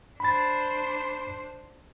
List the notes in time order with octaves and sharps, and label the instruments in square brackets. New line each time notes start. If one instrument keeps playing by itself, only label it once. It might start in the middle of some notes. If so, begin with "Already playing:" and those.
[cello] D4 C5 [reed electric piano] B5 A6